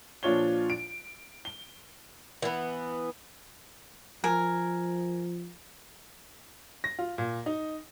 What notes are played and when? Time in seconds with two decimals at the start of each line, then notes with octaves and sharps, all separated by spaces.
0.23 A#2 F3 D4 F4 C#5 G7
0.70 D7
1.45 G7
2.42 E3 B3
4.24 F3 A#4 G#5
6.84 A#6
6.99 F4
7.18 A#2
7.46 D#4